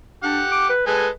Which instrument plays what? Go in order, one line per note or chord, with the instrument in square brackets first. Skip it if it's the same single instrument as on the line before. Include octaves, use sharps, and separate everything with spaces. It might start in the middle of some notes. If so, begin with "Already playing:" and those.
[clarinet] D4 [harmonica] G4 F#5
[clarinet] D6
B4
[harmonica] G#3 A4 G#5 [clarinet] B4